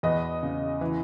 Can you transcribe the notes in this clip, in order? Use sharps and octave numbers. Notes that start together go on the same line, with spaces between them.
E2 B4 D#5
C#3
E3